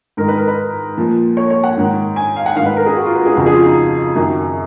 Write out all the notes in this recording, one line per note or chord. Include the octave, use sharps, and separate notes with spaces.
G#2 D#3 A#4
B4
A#4
B4
A#2 F3
C#5
C#5
F#5
G#2 D#3
G#5
F5
F#5
G#2 D#3 F5
B4
A#4
G#4
F#4
F4
B4
G#4
F2 C#3 F3 F#4
G#4
F4
D#4
F#2 D#3